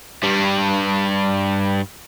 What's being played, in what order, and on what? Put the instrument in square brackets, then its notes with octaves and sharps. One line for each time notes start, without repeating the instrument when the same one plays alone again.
[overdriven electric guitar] G2 G3